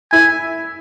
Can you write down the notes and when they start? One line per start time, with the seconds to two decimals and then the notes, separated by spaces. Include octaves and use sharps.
0.11 E4 G#5